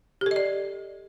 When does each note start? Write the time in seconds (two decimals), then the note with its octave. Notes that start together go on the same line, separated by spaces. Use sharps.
0.21 G4
0.26 A4
0.31 D#5
0.36 D5